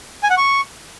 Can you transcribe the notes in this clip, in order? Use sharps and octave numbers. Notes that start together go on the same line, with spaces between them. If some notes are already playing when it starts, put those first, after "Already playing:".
G#5
F#5
C#6